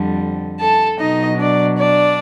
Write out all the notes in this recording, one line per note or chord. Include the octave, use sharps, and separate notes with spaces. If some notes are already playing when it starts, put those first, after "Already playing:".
Already playing: F2 D3 G3
A4 A5
B2 F#3 D#4 D#5
D4 D5
D4 D5